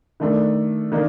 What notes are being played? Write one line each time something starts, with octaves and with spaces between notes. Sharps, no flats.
D#3 A3 D4
D#3 A#3 D4